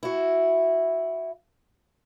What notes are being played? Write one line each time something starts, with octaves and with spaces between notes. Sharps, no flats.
E4 F#4